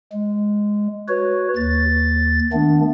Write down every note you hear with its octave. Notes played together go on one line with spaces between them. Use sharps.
G#3
F#4 B4 C#5
D#2 A6
D#3 A3 B3 D4